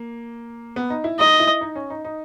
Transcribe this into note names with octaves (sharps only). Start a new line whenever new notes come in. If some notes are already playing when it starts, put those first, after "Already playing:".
Already playing: A#3
B3
D#4
E4
D#4 D#5
E4
D#4
C#4
D#4
D#4